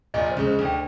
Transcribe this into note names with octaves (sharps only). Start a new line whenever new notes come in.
A#1 A#2 D#5
C5
C#2 C#3
C5
D2 D3
G5